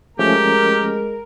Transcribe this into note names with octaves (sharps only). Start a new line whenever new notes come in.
F3 G#3 A3 C#4 G4 A#4